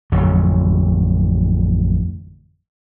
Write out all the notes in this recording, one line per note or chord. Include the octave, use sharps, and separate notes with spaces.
A1 F2 D3 F#3